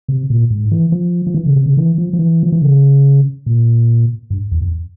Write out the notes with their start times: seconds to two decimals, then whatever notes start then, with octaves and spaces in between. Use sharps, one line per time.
0.08 C3
0.30 A#2
0.50 G#2
0.71 E3
0.92 F3
1.27 F3
1.34 E3
1.46 C#3
1.56 C3
1.66 C#3
1.77 E3
1.98 F3
2.13 F3
2.19 E3
2.43 F3
2.52 E3
2.61 C#3
3.46 A#2
4.30 G2
4.51 E2
4.62 F2